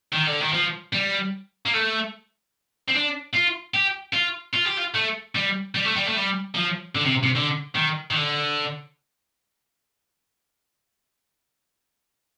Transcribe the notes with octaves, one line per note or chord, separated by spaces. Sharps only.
D#3
D3
D#3
F3
G3
A#3
A3
C4
D4
F4
G4
F4
F4
G4
F4
A3
G3
G3
A3
G3
A3
G3
F3
D3
C3
C3
D3
D#3
D#3
D3